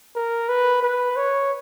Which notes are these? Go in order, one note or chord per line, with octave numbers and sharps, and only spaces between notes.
A#4
B4
B4
C#5